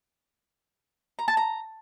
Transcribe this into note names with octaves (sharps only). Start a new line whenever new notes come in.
A#5
A5
A#5